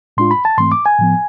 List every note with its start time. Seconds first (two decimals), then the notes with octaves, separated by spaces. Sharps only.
0.17 A2 G#3 D4 F4 C6
0.31 B5
0.45 A5
0.58 G#2 E3 A3 C4 C6
0.72 D6
0.86 G#5
0.99 A2 F3 B3